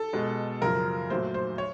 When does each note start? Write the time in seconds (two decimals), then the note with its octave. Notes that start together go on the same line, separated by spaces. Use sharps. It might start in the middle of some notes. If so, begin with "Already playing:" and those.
Already playing: A4
0.13 B2 G#3
0.61 F#2 C#3 F3 A#4
1.10 A#2 F#3 A3 C5
1.34 C5
1.58 C#5